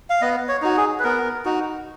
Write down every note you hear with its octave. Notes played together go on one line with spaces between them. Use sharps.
F5
B3 D#5
C#5
D#4 F#4
G#4
B4
B3 A#4
D#4 F#4